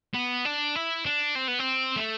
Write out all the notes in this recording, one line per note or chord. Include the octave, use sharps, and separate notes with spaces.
B3
D4
E4
D4
C4
B3
C4
A3